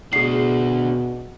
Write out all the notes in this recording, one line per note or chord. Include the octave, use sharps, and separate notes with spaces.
B2 D4 F#4 G#4 C7